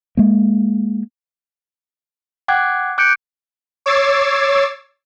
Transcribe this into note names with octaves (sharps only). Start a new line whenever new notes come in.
G#3 A#3
F#5 G5 D6 F#6 G#6
D6 F#6 G6 C#7 D7
C#5 D6 E6 G#6 A6 C7